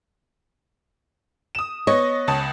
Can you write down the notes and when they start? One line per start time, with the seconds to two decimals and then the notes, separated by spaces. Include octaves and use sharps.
1.55 D#6 E7
1.87 B3 C#5 D#5
2.28 C#2 A5 D#6